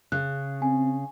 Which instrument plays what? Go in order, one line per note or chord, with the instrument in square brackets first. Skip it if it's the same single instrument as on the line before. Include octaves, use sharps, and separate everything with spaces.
[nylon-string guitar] C#3 [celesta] F#6
[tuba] C4 [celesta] G#5